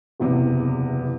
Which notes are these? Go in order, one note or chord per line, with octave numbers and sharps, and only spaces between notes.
F#1 E2 C3